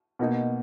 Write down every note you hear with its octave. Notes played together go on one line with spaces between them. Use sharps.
B2 A#3 D#4